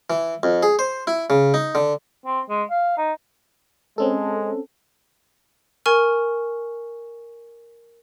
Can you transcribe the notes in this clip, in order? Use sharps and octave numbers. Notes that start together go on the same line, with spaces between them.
E3
F2
G#4
C5
E4
C#3
D#4
D3
C4
G#3
F5
D#4
G#3 C4 C#4 A4
A#4 G#5 C#6 F6